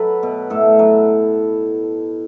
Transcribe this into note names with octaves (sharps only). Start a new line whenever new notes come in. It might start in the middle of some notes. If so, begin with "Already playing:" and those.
Already playing: F#3 A4 B4
B2
A2 A4
F#3